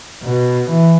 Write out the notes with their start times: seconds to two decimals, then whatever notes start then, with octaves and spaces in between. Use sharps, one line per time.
0.23 B2
0.69 E3